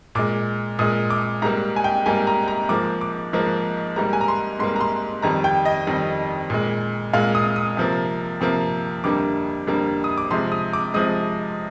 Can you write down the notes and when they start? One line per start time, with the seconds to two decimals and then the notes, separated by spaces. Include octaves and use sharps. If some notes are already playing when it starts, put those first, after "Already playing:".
0.15 A#2 G#3 D6
0.79 A#2 G#3 D#6
1.10 D6
1.42 G#2 G3 A#3 A#5
1.76 G#5
1.84 G5
2.06 G#2 G3 A#3 G#5
2.27 A#5
2.48 A#5
2.69 G#2 F3 A#3 D6
3.01 D6
3.33 G#2 F3 A#3
3.96 G#2 G3 A#3 A#5
4.13 G#5
4.21 A#5
4.28 C6
4.59 G#2 G3 A#3 C6
4.76 A#5
4.81 C6
5.22 F2 D#3 G3 A#5
5.44 G5
5.65 D#5
5.87 F2 D#3 G3
6.50 A#2 G#3
7.13 A#2 G#3 F5
7.35 D#6
7.56 D#6
7.77 C3 F3 A#3
8.41 C3 F3 A#3
9.04 F2 D3 G3 A#3 D6
9.67 F2 D3 G3 A#3
10.04 D#6
10.18 D6
10.31 C3 F3 G#3 C6
10.52 D#6
10.73 D6
10.94 C3 F3 G#3 D#6